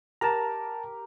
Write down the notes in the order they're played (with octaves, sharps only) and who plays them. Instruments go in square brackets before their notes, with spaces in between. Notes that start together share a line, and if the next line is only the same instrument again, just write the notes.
[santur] G4 A#4 [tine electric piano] A5 A#5